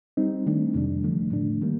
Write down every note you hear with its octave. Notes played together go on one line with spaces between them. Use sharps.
G3 C4 D#4
D#3 A3 D4
F2 C3 D#3 G3 D4
D3 F3 A3
A2 A3 D4
D#3 G3 A#3